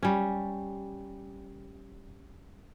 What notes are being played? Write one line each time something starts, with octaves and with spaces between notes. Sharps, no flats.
G3 C#4